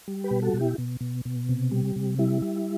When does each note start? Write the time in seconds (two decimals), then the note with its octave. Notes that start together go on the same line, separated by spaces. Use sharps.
0.08 G3
0.24 G4 B4
0.31 B2
0.42 F#4 A4
0.53 B2
0.60 E4 G4
0.78 B2
1.01 B2
1.25 B2
1.49 C3
1.71 G3
1.96 C3
2.19 G3 E4
2.42 G3